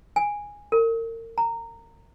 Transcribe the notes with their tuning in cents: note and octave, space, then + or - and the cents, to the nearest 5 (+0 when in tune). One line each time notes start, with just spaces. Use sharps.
G#5 -10
A#4 -35
A#5 -15